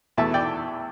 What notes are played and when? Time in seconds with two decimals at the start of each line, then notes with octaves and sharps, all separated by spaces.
0.17 E2 B2 A3 E4 E5 A5
0.34 D5 G5